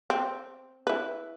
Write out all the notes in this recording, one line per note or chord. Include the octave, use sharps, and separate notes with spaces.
C4
E4 B4